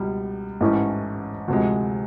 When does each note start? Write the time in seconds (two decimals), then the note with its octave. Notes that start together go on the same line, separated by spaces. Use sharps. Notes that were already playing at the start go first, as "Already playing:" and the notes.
Already playing: C#2 B2 G3
0.60 A1 G#2 E3 A3 C#4
1.48 D2 C3 F3 G#3